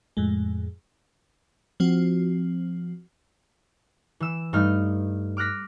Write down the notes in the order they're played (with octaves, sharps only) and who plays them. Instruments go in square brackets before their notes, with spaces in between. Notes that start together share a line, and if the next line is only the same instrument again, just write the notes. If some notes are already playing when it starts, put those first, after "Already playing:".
[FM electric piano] F2 A2 G#3
F3 C4 F#4
[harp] E3 E6
G2 A3 D#4 F6
D6 F6 F#6 A#6 B6